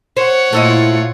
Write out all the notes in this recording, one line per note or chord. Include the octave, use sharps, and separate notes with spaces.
C5 C#5 F#5
A#2 A3 E4 F4 D#5